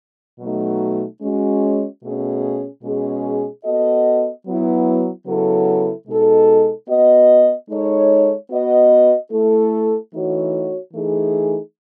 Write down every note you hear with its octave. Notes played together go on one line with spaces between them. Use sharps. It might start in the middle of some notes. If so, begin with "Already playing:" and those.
B2 F#3 A3 D#4
G#3 C#4 F#4
B2 A3 C#4 G#4
B2 G#3 C#4 G#4
B3 F#4 A4 D#5
F#3 B3 E4
C#3 F#3 B3 E4 A4
B2 G#3 D#4 A4
B3 F#4 B4 D#5
G#3 D#4 A4 C#5
B3 F#4 B4 D#5
A3 E4 A4
E3 A3 D#4 F#4 C#5
E3 A3 D#4 G#4